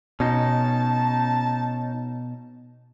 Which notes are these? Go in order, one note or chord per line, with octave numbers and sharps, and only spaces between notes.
B2 C#4 D#4 A5